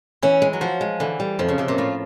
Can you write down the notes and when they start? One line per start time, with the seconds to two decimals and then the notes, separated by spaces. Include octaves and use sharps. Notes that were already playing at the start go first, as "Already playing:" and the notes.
0.22 E3 C#4
0.42 G#3
0.53 F#3
0.61 F3 F#4
0.81 G#3
1.00 D3 E3
1.20 G3
1.39 F2 F3
1.48 C#3
1.58 F2 C3
1.68 A#2
1.78 A2 F4